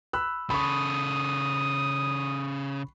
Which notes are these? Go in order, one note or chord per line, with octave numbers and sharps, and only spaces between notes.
B5 E6 F#6
C#3 A4 B5 C#6 D#6